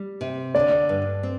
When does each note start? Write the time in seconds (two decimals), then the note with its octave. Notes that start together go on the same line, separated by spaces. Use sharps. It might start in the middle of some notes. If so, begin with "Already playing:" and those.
Already playing: G3
0.21 C3
0.55 D3 D5
0.89 G2
1.23 C4